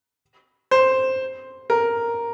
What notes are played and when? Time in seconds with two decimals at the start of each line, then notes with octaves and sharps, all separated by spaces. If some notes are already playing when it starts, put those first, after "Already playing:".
0.71 C5
1.70 A#4